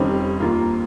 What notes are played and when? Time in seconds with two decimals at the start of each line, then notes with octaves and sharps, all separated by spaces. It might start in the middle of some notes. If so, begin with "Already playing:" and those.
Already playing: F1 F2 D#3 G3 C#4
0.40 D#2 D#3 A#3 F4